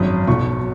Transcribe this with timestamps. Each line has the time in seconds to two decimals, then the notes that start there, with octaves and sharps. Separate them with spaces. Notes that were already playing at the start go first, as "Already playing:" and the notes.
Already playing: G#1 F#2 F#3 D#6
0.27 B1 B2 F#3 C#6